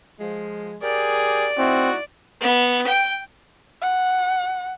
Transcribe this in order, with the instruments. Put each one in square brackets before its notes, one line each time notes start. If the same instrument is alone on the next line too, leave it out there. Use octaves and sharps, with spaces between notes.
[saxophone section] F3 G#3
[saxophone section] G4 A#4 [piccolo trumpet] G#4 [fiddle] D5
[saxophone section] A3 D#4 E4 [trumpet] C4 [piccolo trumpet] F#4
[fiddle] B3
G5
[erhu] F#5